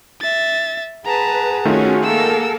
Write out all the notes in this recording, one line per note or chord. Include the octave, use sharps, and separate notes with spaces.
E5 A6
G#4 B4 F#5 A5 A#5
D#3 A3 C#4 F4 F#4
A#3 A4 A#4 E6